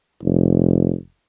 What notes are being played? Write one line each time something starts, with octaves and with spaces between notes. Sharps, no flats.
F1